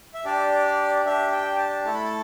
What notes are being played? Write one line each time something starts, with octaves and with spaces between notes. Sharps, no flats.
E5
D4 G4 D5
D4 G4 E5
G5
A5
A3 E4 A4 A5
B5
A5